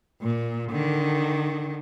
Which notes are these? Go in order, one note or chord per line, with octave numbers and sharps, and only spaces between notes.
A#2
D3 D#3